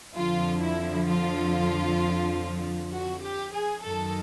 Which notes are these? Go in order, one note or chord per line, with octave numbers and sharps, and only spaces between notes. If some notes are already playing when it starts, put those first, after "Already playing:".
F2 D3 F3 F4
E4
F4
F#4
G4
G#4
F#2 D#3 A4